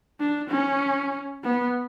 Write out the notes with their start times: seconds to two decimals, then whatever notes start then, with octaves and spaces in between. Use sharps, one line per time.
0.20 D4
0.50 C#4
1.44 B3